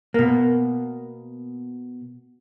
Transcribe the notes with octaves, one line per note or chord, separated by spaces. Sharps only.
B2 A#3